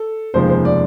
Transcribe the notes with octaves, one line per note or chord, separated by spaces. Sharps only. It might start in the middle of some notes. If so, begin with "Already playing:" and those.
Already playing: A4
F1 D#2 C#3 F3 G#3 C5
C5
D5